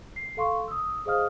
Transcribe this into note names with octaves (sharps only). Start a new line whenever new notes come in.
C7
A4 F5 C6 C#6
D#6 E6
G#4 C5 D#5 F5 D#6 F6